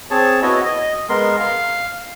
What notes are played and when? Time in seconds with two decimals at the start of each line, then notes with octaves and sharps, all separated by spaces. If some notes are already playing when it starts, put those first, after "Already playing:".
0.11 C4 G#4 C#5 A5
0.42 B3 E4 F#4 C#5 D#5
0.65 D#5
1.09 G#3 B3 A#4 C6
1.40 F5